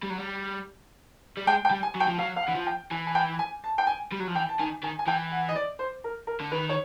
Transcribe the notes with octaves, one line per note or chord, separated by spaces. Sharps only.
G3
F#3
G3
G3
G#3 G5
G5
G3
G#5
F#3
G5
F3
F#3 F5
F5
F#5
E3
F3
G5
E3 G#5
G#5
G5
G#5
A5
G5
G#5
G3
F#3
F3
E3 G5
A5
D#3 G#5
D#3 G#5
G#5
E3 G5
F#5
D#5
D5
C5
A#4
A#4
D3
D#3 B4
C#5